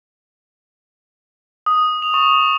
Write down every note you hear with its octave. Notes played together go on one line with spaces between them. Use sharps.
D#6
F7
C#6